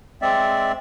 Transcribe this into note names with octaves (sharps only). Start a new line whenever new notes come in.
G#3 C4 D5 E5